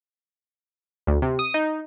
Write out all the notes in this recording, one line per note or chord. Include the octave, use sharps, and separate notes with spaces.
D2
C3
D#6
D#4